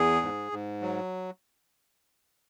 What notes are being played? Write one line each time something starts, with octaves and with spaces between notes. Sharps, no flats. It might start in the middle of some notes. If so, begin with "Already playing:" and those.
Already playing: E2 G#4
G#2
G#2
F#3